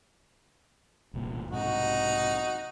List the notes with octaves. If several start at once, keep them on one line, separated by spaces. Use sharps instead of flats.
E1 C2 A#2
B1 G#2 C3 D#4 F#4